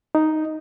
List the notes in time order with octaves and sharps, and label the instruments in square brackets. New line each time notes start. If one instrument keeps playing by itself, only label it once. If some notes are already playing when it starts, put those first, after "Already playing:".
[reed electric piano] D#4